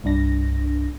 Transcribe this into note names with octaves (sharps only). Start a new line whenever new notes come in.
C2 G2 D4 A#6